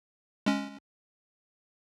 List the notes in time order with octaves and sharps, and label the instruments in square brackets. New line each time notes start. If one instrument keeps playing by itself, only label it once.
[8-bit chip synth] G#3 C#4